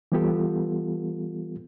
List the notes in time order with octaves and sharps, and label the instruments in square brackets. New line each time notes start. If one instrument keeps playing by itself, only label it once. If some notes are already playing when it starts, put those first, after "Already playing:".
[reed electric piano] E3 G3 B3 F4 G4 A4